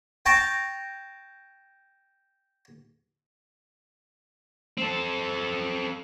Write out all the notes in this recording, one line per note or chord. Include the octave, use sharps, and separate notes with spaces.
G5 A5 A#5 C#6
C4 A4